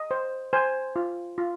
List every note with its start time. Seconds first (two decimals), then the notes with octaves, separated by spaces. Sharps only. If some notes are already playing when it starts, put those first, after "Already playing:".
Already playing: D#5
0.11 C5
0.53 C5 G#5
0.96 F4
1.38 F4